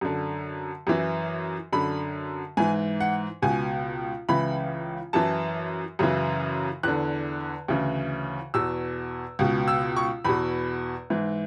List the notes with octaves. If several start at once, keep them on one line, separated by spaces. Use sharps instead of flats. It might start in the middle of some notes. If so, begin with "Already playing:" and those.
F#2 D3
F#2 E3
F#2 D3 B5
G#2 E3 G#5
F#5
C#2 B2 G#5
C#2 C#3 E3 B5
F#2 E3 A5
F#2 C#3 E3
E2 D3 F#6
D2 C#3 E3
E2 B2 E6
C#2 B2
E6
C#6
E2 B2 B5
G#2 E3